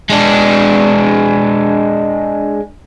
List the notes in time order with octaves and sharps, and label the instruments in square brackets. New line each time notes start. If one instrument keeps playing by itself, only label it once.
[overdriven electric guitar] G#3 D4